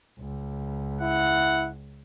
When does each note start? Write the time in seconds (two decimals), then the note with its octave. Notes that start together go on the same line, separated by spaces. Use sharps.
0.19 C#2
1.01 E4 F#5